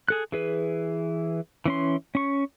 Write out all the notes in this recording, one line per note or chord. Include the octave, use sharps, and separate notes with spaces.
G#4 A4 F#6
E3 G#4 B4
E3 C#4 C6
C#4 C#6